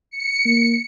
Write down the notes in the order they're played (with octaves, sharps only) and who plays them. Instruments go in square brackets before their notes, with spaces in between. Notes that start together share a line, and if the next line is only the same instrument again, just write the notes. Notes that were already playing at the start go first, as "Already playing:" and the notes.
[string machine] C#7
[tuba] A#3